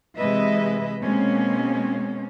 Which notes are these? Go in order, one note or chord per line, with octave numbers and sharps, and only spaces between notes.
C3 E3 G#3 B4 D#5 E5
B2 G#3 A#3 C4 C#4